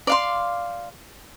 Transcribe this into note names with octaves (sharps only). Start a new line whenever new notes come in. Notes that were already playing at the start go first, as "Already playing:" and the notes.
D5 F5 C6